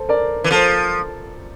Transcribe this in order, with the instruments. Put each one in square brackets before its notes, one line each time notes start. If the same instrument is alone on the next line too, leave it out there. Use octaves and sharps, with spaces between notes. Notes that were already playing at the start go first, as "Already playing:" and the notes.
Already playing: [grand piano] A4 C5
A#4 D5
[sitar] E3
[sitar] F3 [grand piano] A4 C5